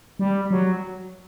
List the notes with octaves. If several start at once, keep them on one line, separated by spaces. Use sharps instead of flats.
G3
F#3